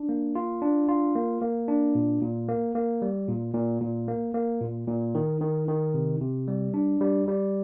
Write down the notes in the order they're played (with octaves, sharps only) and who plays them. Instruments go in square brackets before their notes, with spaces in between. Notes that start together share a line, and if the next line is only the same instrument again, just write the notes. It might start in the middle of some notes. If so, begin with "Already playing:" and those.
Already playing: [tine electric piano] D4
A#3
F4
D4
F4
A#3
A#3
D4
A#2
A#2
A#3
A#3
G3
A#2
A#2
A#2
A#3
A#3
A#2
A#2
D#3
D#3
D#3
C3
C3
G3
D4
G3
G3